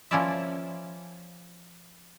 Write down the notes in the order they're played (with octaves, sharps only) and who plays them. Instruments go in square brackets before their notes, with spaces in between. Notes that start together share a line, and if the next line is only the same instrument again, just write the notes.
[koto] F3 A#3 C#4 E4 D5 E5